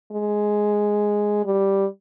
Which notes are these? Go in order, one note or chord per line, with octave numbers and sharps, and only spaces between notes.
G#3
G3